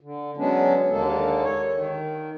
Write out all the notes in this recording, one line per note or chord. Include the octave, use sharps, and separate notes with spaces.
D3
F#3 G#3 B3 C#4 D4
D#2 D3 G#3 A#3 A4
C#5
D#3